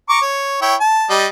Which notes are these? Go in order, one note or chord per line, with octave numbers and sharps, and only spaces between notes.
A#5 C#6 D6
C#5
E4 C#5 G5
A5
G3 D#5